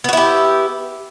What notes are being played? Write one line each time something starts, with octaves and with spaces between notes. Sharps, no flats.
B3 E4 F#4 G4